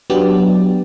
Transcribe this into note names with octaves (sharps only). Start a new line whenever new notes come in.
F#3 B3 D4 G4 D5